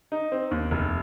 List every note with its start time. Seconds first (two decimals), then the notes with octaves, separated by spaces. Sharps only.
0.12 D#4
0.32 C4
0.51 D#2
0.71 F1